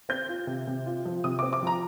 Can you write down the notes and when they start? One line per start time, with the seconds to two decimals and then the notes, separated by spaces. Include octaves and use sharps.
0.09 C4 G6
0.29 F4
0.47 C3
0.67 C3
0.86 F4
1.06 F3
1.24 C3 D#6
1.39 C4 D6
1.53 D6
1.62 F3 A#5